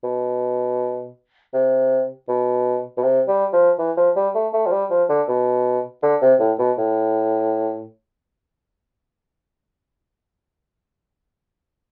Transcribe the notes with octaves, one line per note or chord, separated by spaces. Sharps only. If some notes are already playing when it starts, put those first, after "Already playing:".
B2
C3
B2
B2
C3
G3
F3
E3
F3
G3
A3
A3
F3
G3
F3
D3
B2
D3
C3
A2
B2
A2